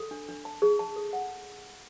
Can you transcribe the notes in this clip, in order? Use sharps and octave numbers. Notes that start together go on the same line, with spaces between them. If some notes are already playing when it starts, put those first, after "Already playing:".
Already playing: A4
D4
D4
A5
G#4
A5
A4
F#5